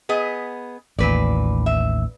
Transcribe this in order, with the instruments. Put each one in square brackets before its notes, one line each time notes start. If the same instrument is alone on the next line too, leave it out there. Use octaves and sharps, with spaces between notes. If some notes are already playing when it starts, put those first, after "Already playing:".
[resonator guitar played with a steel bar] B3 G#4 D#5
[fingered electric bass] A1 D#2 [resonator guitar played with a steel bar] A#2 B4 D5
[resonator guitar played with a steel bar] E5